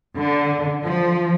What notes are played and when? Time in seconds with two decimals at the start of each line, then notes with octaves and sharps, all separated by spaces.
0.17 D3
0.86 F3